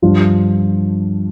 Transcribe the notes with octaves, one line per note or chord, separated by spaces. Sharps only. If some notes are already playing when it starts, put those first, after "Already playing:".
G2 F3 D4 F4